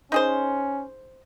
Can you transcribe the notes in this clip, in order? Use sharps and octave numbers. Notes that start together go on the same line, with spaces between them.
C#4 D#4 G#4 C5